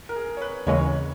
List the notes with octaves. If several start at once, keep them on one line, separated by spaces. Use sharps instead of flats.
A#4
G#4
C#5
B4
D#2 C#3 E3 G#3 C#4 C#5